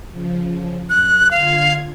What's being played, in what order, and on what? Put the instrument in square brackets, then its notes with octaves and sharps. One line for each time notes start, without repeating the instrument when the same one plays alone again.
[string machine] C#3 F3
[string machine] F#2 [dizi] F#6
[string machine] D3 F4 G#6 [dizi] F5